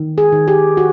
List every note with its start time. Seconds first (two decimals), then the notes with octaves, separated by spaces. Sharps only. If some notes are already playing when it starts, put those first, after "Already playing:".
Already playing: D#3
0.18 G#4
0.32 D#3
0.48 G4
0.77 F#4